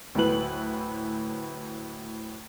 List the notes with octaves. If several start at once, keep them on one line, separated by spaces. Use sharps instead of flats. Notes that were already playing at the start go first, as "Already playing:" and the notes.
D2 A2 F#3 E4 B4 F#7